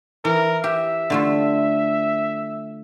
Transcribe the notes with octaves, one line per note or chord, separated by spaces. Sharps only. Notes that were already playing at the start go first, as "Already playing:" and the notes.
E3 A#4
G4 E5
D3 A3 F4